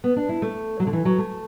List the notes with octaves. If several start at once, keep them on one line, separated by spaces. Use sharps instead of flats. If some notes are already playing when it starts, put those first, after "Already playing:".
B3
D4
E4
A3
F#3
D3
E3
F#3
A3